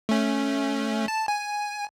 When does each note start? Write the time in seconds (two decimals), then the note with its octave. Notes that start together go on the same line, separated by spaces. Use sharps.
0.09 A3 C#4
1.08 A5
1.28 G#5